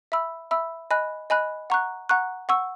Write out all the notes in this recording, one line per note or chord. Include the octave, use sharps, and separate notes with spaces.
E5 B5 E6
E5 B5 E6
D#5 G#5 B5 F#6
D#5 G#5 B5 F#6
F#5 A#5 C#6 F#6
F#5 A#5 C#6 F#6
F#5 C#6 E6